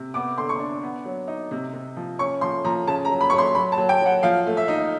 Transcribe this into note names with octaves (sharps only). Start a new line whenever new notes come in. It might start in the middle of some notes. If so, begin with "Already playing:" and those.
Already playing: C3
B3 D6
D3 C6
C#6
D4
B3
F#3
D#4
C3
C3
F3
C#4 C#6
F3 C6
F3 A#5
C#3 A5
A#5
F#3
B5
F#3 C#6
C6
F#3 B5
A5
F#3
G5
F#3 F#5
F3 F5
A3
E5
D#4